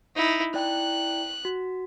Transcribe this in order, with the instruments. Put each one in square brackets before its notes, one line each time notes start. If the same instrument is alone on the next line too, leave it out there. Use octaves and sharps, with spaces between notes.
[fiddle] D#4 E4
[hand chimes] E4 D5 G5 [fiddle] F#6
[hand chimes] F#4